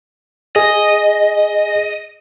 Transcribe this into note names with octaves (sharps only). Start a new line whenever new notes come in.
G#4 D#5